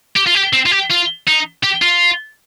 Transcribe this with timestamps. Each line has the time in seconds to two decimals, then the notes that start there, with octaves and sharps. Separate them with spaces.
0.16 G4
0.27 F4
0.35 G4
0.53 C4
0.66 F4
0.71 G4
0.90 F4
1.27 D#4
1.64 G4
1.82 F4